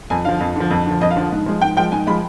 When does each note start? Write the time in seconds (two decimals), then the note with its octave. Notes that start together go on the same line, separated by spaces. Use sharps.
0.10 F2 G#5
0.25 D3 F3 F5
0.40 F2
0.56 D3 F3
0.70 F2
0.86 D3 F3
1.01 F2 D#5
1.11 F5
1.16 D3 F3
1.32 G#2
1.46 F3 G#3
1.61 G#2 G5
1.77 F3 G#3 G5
1.92 G#2 G#5
2.07 F3 G#3 B5